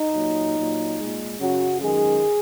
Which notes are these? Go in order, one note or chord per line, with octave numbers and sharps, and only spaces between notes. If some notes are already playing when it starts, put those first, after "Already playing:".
Already playing: D#4
A#2 F#3
A#2 F#3
A#2 G#3
F#2 C#3 F#3 F#4
F#2 D#3 G#3 G#4